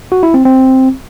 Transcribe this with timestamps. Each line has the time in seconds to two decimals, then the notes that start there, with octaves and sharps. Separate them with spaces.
0.12 F#4
0.23 E4
0.34 C4
0.45 C4